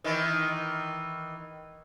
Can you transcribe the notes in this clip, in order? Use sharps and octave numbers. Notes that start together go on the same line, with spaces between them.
D#3 E3